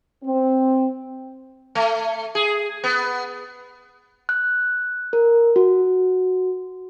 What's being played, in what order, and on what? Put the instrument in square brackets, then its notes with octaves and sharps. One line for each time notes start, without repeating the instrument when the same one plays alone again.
[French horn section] C4
[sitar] A3
G#4
B3
[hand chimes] F#6
A#4
F#4